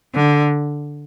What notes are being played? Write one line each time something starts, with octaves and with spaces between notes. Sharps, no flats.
D3